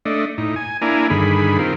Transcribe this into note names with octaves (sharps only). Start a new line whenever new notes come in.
A3 D4 D#5
A2 D#4
G#5
A#3 D4 E4 G#5 A#5
G2 D3 D#3 G#4 B5
D#3 C4 F4 A#4